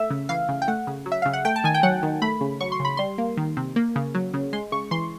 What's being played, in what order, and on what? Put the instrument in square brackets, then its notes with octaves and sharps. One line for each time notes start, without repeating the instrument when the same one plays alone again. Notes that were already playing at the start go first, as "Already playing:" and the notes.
Already playing: [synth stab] A3 E5
C#3
E3 F5
C#3
G5
A3 F#5
C#3
F#3
E5
C#3 F5
F#5
A3 G5
A5
D#3 G#5
G5
F#3 F#5
D#3
A3 B5
C#3
F#3 C#6
C6
C#3
B5
G3 C6
A#3
D#3
C3
A#3
C#3
F#3
C#3
G#3 C6
C#3 C#6
E3 C6